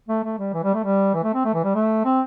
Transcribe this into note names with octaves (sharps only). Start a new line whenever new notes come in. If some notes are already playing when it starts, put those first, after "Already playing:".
A3
A3
G3
E3
G3
A3
G3
E3
A3
C4
A3
E3
G3
A3
C4